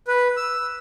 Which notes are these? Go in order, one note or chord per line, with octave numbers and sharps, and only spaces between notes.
B4
E6